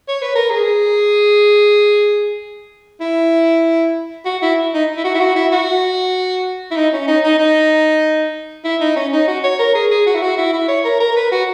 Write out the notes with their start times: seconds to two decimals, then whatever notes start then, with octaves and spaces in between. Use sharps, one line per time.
0.08 C#5
0.22 B4
0.35 A#4
0.50 G#4
3.01 E4
4.25 F#4
4.42 E4
4.74 D#4
4.97 E4
5.04 F#4
5.15 E4
5.20 F#4
5.35 E4
5.52 F#4
6.71 E4
6.77 D#4
6.93 C#4
7.08 D#4
7.24 D#4
7.39 D#4
8.64 E4
8.81 D#4
8.96 C#4
9.12 D#4
9.28 F#4
9.44 C#5
9.59 A#4
9.75 G#4
9.91 G#4
10.06 F#4
10.15 E4
10.22 F#4
10.37 E4
10.53 E4
10.68 C#5
10.85 A#4
11.00 A#4
11.11 A#4
11.16 B4
11.32 F#4